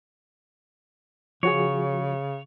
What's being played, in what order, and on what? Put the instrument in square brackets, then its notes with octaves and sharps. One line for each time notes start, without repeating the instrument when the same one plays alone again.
[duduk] C#3 [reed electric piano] F3 F#4 G#4 [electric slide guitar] C#5